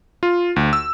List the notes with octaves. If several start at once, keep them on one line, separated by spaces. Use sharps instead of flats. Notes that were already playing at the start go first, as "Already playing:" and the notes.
F4
D2
E6